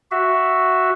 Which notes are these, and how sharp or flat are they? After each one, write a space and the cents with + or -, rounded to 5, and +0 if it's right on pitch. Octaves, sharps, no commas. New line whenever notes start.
F#4 +0 E5 +0